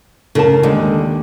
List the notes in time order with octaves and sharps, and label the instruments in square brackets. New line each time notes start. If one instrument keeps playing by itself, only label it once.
[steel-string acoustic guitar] C#3 [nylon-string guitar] A4 A#4 A5
[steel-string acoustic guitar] D#2 [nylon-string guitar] D3 G#3